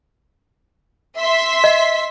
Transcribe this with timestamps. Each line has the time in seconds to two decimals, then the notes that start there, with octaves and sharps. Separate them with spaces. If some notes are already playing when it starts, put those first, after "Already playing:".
1.18 E5 C6 B6
1.64 D#5